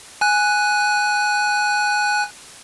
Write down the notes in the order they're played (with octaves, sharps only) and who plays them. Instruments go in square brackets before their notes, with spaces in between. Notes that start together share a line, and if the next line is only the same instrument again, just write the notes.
[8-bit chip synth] G#5 F#6